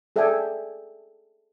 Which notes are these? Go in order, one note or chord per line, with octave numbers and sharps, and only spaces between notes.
G#4 A4 D5 E5 G5 G#5